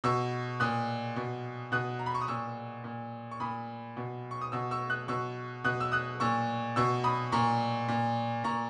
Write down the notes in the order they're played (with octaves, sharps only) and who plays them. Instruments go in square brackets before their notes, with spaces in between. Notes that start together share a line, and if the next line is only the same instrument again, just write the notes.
[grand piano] B2 C#6 E6
A#2 D#6 F#6
B2
B2 D#6 F#6
A#5
B5
C#6
D#6
A#2 C#6 E6
A#2
C#6
A#2 B5 D#6
B2
C#6
D#6
B2 C#6 E6
C#6 E6
D#6 F#6
B2 C#6 E6
B2 D#6 F#6
E6
D#6 F#6
A#2 C#6 E6
B2 C#6 E6
B5 D#6
A#2 A#5 C#6
A#2
A#2 A#5 C#6